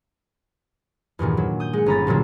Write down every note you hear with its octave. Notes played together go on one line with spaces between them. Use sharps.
E2 G2 A#2 D#3
F#3
D#6 G6
G#3 F#5
G1 C#4 A#5 B5 A6
C2 A#2 D3 F#3 A#3